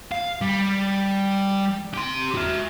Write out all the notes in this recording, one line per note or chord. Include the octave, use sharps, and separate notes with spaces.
F5
G3
G4 C6
F#4 E5